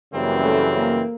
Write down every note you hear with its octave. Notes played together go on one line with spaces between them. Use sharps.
F#2 C#3 E3 G3 A#3 C4
A3
A#3